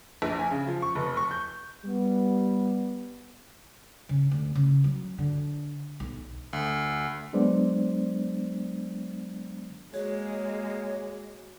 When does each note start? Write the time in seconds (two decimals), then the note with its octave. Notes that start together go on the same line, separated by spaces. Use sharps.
0.22 A#1
0.39 G#5
0.50 C#3
0.67 F3
0.82 C#6
0.95 F1
1.17 C#6
1.31 G6
1.84 G3 B3
4.09 C#3
4.31 D2
4.55 C#3
4.84 F#3
5.18 D3
6.00 B1
6.53 D2
7.33 F#3 G#3 B3 D4 C5 D5
9.94 G#3 A#3 F#4 G#4 C#5